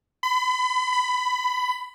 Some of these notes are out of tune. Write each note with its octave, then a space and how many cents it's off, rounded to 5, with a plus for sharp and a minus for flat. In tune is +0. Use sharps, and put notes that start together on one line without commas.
B5 +35
B5 +20